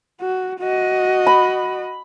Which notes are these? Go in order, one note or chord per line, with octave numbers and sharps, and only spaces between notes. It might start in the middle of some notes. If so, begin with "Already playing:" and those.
F#4
F#4 D#5
B5